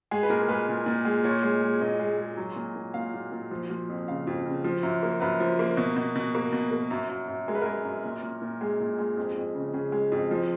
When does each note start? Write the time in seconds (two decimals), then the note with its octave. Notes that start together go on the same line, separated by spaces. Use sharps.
0.11 G#3 G#4
0.23 B4
0.30 A#2 A#4
0.48 G#3 B4
0.68 A#2
0.86 A#2
1.05 G#3
1.24 A#2 C#5
1.43 G#3
1.62 G#3
1.81 A#2 D#5
1.99 G#3
2.18 G#3
2.37 F#3
2.56 A#2
2.76 A#2
2.94 A#2 F5
3.14 A#2
3.32 A#2
3.51 F3
3.70 F3
3.89 F2
4.08 C#3 F5
4.27 F2
4.46 C#3
4.64 F3
4.83 F#2
5.03 A#3
5.20 F#2 B4
5.40 F3
5.59 A#3
5.77 B2
5.96 B2
6.16 B2
6.35 A#3
6.52 B2
6.71 A#3
6.91 F#2
7.09 F#2
7.28 F#2
7.48 G#3 A#4
7.55 B4
7.62 G#3 A#4
7.85 F#2
8.04 A#2
8.23 A#2
8.42 A#2
8.61 G#3 G#4
8.80 A#2
8.99 G#3
9.17 F2
9.36 F2
9.55 C#3
9.73 C#3 G#4
9.92 G#3
10.12 F2
10.31 F3